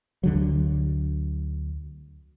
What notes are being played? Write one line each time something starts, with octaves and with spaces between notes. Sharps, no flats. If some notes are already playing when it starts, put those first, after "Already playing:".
D2 D3 F#3